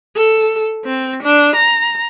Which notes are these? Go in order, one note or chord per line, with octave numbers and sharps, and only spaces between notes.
A4
C4
D4
A#5